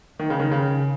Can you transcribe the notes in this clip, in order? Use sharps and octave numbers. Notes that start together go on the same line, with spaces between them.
D#3
C#3
D#3
C#3